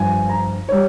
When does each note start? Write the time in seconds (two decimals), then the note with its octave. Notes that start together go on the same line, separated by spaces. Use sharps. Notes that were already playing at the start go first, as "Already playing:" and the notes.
Already playing: G2 F3 G#5
0.29 A#5
0.69 G3 C#5